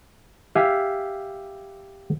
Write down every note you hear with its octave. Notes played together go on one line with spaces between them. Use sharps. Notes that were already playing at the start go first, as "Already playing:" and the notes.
G4 E5 F5 G#5